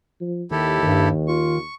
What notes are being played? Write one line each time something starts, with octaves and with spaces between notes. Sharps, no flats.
F3
D#2 D#3 E4 G4 A4
G2 D#3
F4 C#6